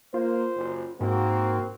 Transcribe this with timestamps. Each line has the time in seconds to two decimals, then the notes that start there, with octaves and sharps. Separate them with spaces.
0.14 A#3 F4 C5
0.56 F#1
1.01 G#2 A#3 C4 F#4